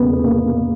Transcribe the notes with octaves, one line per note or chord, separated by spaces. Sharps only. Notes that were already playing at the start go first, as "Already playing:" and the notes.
Already playing: E2 C#3 G3 A#3 B3
B3
A#3
A#3